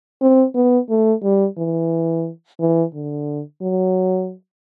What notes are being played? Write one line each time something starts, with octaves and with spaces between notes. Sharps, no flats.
C4
B3
A3
G3
E3
E3
D3
F#3